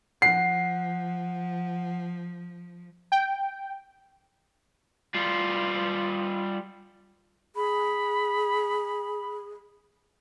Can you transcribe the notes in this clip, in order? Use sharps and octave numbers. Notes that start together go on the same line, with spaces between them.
F3 F#5 C7
G5
G3 F4
G#4 B5